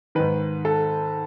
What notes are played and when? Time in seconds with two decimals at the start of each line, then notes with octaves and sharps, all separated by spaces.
0.15 G#2 D#3 B4
0.65 A4